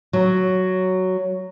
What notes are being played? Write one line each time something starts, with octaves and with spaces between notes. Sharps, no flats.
F#3